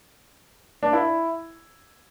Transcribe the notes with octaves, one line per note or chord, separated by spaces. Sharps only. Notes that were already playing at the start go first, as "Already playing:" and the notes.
D4
E4